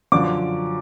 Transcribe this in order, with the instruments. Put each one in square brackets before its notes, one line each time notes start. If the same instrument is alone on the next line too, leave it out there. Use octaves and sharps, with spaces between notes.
[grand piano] F#2 D3 F3 D6